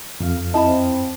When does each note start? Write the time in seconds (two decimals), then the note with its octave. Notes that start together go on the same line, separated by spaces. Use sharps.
0.20 F2 F5
0.54 C4 E4 D#5 A5 B5